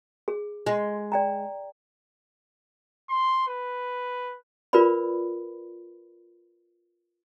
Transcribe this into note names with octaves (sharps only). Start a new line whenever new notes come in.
G#4
G#3
D5 G5 A#5
C6
B4
F4 A#4 B4 D5 B5